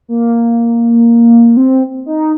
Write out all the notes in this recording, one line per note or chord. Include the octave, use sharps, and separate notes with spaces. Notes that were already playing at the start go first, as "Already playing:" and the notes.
A#3
C4
D#4